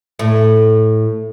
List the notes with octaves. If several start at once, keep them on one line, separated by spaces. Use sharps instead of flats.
A2